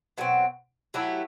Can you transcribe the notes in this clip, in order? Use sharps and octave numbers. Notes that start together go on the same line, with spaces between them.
B2 F#3 A3 C4
F#3 A3 E4 G4